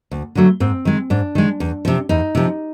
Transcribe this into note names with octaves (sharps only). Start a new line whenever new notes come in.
D2
D3 F#3 A3
G#2 C4
D#3 G#3
G#2 D4
D#3 G#3
E2
C3 F3
E2 D#4
C3 F3